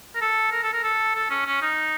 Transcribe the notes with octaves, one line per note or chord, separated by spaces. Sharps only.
A#4
A4
A#4
A4
A#4
A4
A4
C#4
C#4
D#4